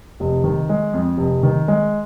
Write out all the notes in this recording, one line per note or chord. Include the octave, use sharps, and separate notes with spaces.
F1
D#3
G#3
F2
F1
D#3
G#3